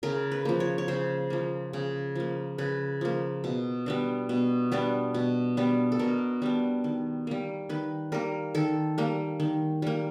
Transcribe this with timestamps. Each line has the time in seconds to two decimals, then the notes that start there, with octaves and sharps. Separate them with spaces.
0.03 C#3 A#4
0.32 B4
0.45 F3 A#3
0.60 C#5
0.78 C#5
0.88 C#3 C5
1.30 F3 A#3
1.73 C#3
2.15 F3 A#3
2.58 C#3 B4
3.01 F3 A#3
3.44 B2
3.86 G3 B3 D4
4.29 B2
4.72 G3 B3 D4
5.14 B2
5.57 G3 B3 D4
5.92 A4
5.99 B2 A#4
6.42 G3 B3 D4
6.84 D#3
7.27 G3 A#3
7.69 D#3 B4
8.12 G3 A#3 A#4
8.55 D#3 A4
8.98 G3 A#3
9.40 D#3
9.82 G3 A#3